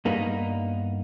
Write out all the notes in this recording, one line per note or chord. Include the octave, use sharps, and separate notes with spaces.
G2 A#3 B3 D#4